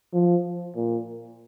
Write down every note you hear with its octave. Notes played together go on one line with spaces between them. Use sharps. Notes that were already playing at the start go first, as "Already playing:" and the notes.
F3
A#2